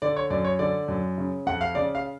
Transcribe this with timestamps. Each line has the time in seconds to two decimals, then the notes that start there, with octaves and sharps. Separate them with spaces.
0.02 D3 D5
0.16 C#5
0.30 F#2 D5
0.44 C#5
0.59 D3 D5
0.88 F#2
1.18 C#3
1.46 F2 F#5
1.61 F5
1.75 C#3 D5
1.95 F5